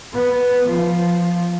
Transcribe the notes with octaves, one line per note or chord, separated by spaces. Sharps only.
B3
F3